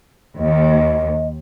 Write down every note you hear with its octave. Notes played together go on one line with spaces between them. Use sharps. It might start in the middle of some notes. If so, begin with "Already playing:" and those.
D#2 D#5